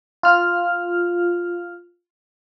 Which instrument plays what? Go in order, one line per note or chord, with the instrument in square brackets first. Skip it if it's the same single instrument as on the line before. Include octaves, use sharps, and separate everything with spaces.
[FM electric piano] F4 F6